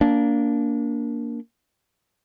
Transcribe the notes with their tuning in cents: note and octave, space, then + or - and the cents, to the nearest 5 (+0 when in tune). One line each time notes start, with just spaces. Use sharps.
A#3 +0 D4 -25